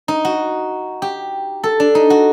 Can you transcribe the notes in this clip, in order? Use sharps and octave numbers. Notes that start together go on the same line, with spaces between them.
D#4
F#4
G4
A4
D4
D#4
F#4